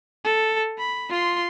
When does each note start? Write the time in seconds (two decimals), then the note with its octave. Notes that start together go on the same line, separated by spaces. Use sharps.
0.25 A4
0.78 B5
1.10 F4 C6